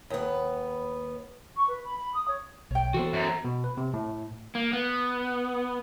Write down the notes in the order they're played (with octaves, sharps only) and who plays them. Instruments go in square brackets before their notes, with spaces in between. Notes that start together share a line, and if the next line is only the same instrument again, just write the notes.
[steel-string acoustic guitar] D#2 B3
[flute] C#6
B4
B5
B5
D#6
C#5
[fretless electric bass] B1 [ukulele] C#5 G5
[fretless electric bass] E3 B3 [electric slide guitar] F#4 A4 C5
[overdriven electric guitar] F#2
[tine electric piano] B2
B4
C3
A2
[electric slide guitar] A#3
B3